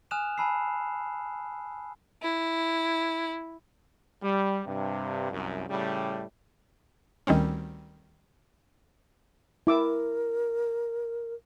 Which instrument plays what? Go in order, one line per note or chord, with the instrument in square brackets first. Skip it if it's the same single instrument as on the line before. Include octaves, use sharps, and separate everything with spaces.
[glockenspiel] G#5 D#6 F6 F#6 E7 F7
G#5 A5 B5 E6 C7
[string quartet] E4
[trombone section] G3
G2 C3
C2 F#2
A2 C#3 G3
[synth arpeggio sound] D2 D#3 G3 C4 C#4
[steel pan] E4 D6 E6 [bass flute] A#4